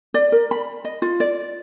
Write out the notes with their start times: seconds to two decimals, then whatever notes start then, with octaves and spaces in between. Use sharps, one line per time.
0.14 D5
0.32 A#4
0.51 B5
0.85 D#5
1.02 F4
1.20 D5